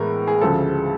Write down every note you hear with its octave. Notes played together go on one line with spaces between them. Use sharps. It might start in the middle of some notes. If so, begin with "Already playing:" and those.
Already playing: A2 E3 G#3 B3 A#4
G#4
D2 C#3 F3 G#3 A4